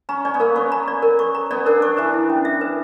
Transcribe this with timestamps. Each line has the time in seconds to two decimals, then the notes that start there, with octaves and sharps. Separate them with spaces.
0.09 C#4 A#5
0.25 C#4 D5
0.34 B3
0.40 A#3 A#4
0.56 B3 C#6
0.72 A#5
0.88 D5
1.03 A#4
1.19 C#6
1.35 A#5
1.51 B3 D5
1.66 D4 A#4
1.82 C#6
1.97 E3 B4
2.14 E4
2.30 C#4
2.45 E5
2.61 B4